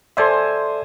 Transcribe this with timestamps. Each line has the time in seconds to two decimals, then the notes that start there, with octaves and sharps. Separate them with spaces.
0.17 A4 C5 D5 E5 G#5 C6